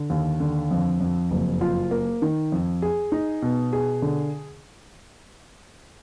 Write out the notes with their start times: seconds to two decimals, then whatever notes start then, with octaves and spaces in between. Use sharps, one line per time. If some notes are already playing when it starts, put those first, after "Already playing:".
Already playing: D3
0.10 D#2
0.40 D3
0.71 F2
1.01 F2
1.31 F#1
1.61 F4
1.91 A#3
2.22 D#3
2.52 F2
2.82 G#4
3.12 D#4
3.42 B2
3.73 G#4
4.02 D3